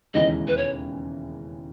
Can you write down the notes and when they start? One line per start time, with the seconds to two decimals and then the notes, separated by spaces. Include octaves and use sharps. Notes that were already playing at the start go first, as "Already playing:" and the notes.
0.14 E1 D#2 C#3 E3 G#3 D#5
0.48 B4
0.57 C#5